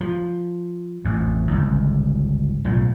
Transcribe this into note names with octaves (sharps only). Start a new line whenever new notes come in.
F3
A1 F2
G1 C#2
B1 A2 F3